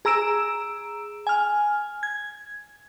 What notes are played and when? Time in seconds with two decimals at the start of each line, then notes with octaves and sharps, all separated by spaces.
0.05 G#4 A#5 E6 D7 E7
1.27 G#5 F6
2.03 G#6